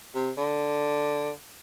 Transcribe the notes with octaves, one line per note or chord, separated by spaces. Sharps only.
C3
D3